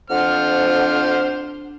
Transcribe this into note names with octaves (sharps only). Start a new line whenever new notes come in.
F2 D4 C5 F#5 F6